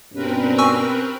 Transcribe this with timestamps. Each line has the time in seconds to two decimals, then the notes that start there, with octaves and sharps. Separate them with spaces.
0.14 G2 B2 C4 C#4 A#4 B4
0.58 G#5 C#6 E6